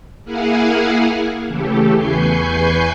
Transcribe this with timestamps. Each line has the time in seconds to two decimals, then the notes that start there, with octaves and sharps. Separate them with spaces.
0.24 A#3 E4 G#4 F5 F#5 G#5
1.47 C#3 E3 A3 G4 A4
1.95 E2 B4 G#5 C#6 G6 C7